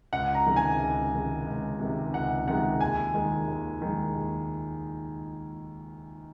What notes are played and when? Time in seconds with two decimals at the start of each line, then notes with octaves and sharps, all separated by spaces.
0.13 C#2 F#5
0.35 A#5
0.46 C3 D#3 G#3
0.56 G#5
0.79 C#2
1.13 C3 D#3 G#3
1.47 C#2
1.79 C3 D#3 G#3
2.14 C#2 F#5
2.47 C3 D#3 G#3 F#5
2.81 D#2 G#5
3.14 D#3 G#3
3.48 D#2
3.82 D#3 G#3
4.15 D#2